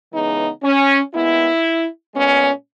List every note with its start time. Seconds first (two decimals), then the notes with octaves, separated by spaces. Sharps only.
0.12 C#3 E3 G#3 B3 D#4
0.63 C#4
1.13 A#2 G#3 B3 E4
2.15 A#2 G#3 B3 C#4